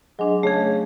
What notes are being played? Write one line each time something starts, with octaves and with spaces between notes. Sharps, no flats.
F#3 G#3 D4
C#3 A3 G#4